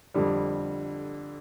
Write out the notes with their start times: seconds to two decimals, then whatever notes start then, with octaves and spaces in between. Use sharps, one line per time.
0.14 F2 D3 G3